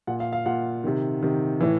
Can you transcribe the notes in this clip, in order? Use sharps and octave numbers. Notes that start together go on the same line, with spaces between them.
A#2 F#5
F5
F5
A#2 F#5
C3 D#3
C3 D#3
A2 E3